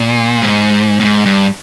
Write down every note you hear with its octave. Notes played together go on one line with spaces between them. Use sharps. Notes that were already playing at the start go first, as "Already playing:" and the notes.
Already playing: A#2
G#2
A2
G#2
G2